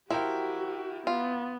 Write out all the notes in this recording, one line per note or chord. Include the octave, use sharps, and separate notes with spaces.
F3 E4 F#4 G4 A#4 G5
B3 F4